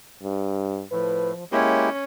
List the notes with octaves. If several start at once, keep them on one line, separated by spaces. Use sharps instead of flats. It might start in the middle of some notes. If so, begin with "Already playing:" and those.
G2
A2 F3 B4
G#3 A#3 C#4 E4 G4 C#5